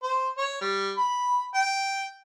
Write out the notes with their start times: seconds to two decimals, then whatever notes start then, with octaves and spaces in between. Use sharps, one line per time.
0.03 C5
0.38 C#5
0.61 G3
0.97 B5
1.54 G5